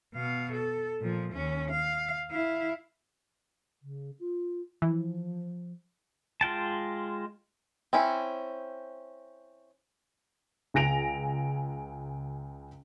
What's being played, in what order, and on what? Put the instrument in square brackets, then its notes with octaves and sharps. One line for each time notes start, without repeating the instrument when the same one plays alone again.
[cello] B2 F5
A4
A#2 F3
D#2 C#4
F5
E4 F5
[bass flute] C#3
F4
[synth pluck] E3 [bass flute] F3
[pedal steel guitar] G#3 F4 G5 A5
[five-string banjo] C4 C#4 E4
[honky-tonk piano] C#2 G#5 A#6 D7 F7